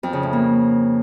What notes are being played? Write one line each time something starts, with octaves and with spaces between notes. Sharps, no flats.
F2
C#3
A2
A#3